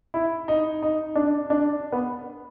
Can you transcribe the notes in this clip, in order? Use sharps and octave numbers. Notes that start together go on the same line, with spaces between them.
E4
D#4
D#4
D4
D4
B3